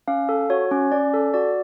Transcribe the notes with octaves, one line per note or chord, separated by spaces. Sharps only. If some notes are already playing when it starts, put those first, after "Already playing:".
C#4 F5
A4
F#4 C#5
C#4
C#4 D5
A4
F#4 D5